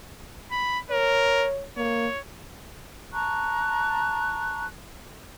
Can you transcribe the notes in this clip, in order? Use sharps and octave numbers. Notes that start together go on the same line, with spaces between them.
B5
A#4 C#5
A#3 C#5
A5 A#5 C#6 F#6